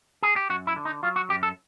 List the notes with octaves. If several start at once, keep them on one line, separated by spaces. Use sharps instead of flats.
G#4
G4
F#2 F#4
E4
D3
D#4
F#3 F4
F#4
F#2 G4
A4